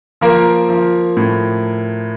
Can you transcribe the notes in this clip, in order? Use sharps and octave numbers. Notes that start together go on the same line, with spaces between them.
F3 A#3 A#4
F3
A2